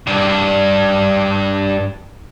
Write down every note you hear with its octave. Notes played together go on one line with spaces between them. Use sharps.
G2 D4